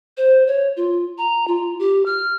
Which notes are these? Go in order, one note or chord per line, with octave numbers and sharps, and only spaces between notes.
C5
C#5
F4
A#5
F4
G4
F6